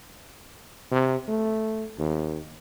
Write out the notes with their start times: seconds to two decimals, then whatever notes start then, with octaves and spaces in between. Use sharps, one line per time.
0.91 C3
1.28 A3
1.98 D#2